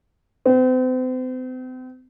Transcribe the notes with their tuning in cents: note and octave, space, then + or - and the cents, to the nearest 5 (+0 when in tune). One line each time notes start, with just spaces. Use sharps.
C4 -40